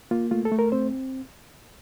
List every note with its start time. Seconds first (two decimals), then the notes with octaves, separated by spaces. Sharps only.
0.11 A#3 F4
0.31 A3 F4
0.45 A4
0.52 A3
0.59 A#4
0.72 C4 C5